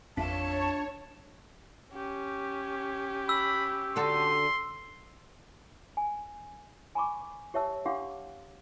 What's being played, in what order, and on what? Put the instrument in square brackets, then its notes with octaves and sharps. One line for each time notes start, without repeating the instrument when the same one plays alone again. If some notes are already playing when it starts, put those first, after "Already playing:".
[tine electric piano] A1 F2 B6 [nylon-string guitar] D4 F4 E5 [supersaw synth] C#5 [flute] A5
[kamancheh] C#4 G4
[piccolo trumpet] B5 [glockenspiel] E6
[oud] D3 F#4 A4 [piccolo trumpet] C6
[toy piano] G#5
G#5 A#5 B5 C#6 D6
G4 C#5 E5 A5 E6
D4 G4 F5 F#5 C6 D6